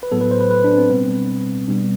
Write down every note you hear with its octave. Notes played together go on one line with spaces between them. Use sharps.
B4
A2 F#3 B3 A4
B4
C5
B4
B4
D4
C4
B2 G3 B3
B2 G3 B3 D4